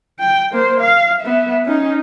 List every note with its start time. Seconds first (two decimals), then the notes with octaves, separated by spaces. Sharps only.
0.20 G5
0.52 A#3 C5
0.81 F5
1.22 B3 E5
1.66 C#4 D#4